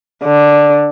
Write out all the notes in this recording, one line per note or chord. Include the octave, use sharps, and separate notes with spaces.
D3